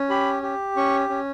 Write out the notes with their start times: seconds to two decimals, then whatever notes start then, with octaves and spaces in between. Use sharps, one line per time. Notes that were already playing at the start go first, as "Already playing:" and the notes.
Already playing: C#4
0.10 G4 B5
0.43 G4
0.77 C#4 C#6
1.09 C#4